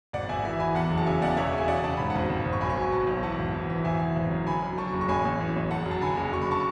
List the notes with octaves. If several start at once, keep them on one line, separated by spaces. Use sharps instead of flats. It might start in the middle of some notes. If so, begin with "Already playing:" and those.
G#1 D5 F#5
G#1 E5 G#5
E3 E5 G#5
E3 G#5 B5
E2 F#5 A5
F#1
A5
C#3 E5 G#5
E2 D5 F#5
E1 C#5 E5
C#3 G#5
C#3 D5 F#5
C#3 A5
G#2 B5
G#1 F#5 A5
G#1
G#1
C#6
B1 G#5 B5
C#6
B2 G#5 B5
B2 F#5 A5
B1
E3 F#5 A5
G#1
E3
E3
G#1 E5 G#5
E3
G#1
F#2
D3 G#5 B5
F#2
F#2 A5 C#6
F#1
C#6
A1 G#5 B5
A1
E3
A1
F#1 F#5 A5
F#2
A5
D3 G#5 B5
F#1
F#1 C#6
B5
A5 C#6